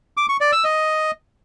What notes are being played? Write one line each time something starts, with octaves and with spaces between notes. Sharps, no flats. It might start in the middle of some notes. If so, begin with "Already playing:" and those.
D6
C#6
D5
E6
D#5